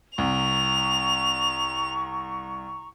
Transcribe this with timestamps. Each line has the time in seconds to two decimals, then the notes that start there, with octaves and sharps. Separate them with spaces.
0.18 C2 A#5 C#6 F7